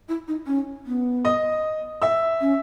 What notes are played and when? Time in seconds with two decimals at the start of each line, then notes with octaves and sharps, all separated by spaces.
0.09 E4
0.28 D#4
0.47 C#4
0.86 B3
1.25 D#5 D#6
2.02 E5 E6
2.41 C#4